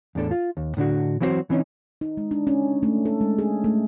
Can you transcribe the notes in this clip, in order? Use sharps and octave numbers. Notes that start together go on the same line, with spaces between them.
E2 A2 D4 A4
F4
D#2
A2 D3 D4 F#4
E3 F#3 C4 E4 F#4 C5
E3 C4 C#4 D#4
D#4
G#3
D4
C#4
A3
A4
G#3
G#4
A3